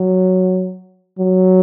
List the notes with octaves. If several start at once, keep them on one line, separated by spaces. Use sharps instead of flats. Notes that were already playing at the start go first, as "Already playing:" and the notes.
Already playing: F#3
F#3